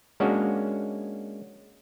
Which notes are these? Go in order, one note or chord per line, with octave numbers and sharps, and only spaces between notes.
G#3 A#3 C#4 D4 F#4